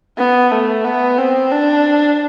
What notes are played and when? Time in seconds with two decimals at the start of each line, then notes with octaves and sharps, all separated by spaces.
0.17 B3
0.51 A3
0.84 B3
1.18 C4
1.52 D4